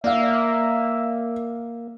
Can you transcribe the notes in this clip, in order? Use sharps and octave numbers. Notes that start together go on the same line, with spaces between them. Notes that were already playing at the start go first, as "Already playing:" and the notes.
A#3 D5 E5 F5